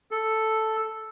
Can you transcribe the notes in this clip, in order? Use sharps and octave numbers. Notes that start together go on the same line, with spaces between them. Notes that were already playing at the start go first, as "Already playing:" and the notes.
A4